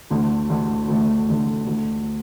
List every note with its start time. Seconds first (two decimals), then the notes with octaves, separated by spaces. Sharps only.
0.10 D2 D3 A3
0.50 D2 D3 A3
0.88 D2 D3 A3
1.28 D2 D3 A3
1.66 D2 D3 A3